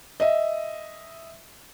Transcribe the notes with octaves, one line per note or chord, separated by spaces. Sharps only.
D#5 E5